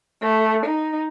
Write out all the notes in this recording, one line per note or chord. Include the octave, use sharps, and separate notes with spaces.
A3
D#4